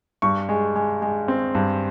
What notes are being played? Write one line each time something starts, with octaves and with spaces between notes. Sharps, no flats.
G2 C#6
G#3
G#3
G#3
C4
G2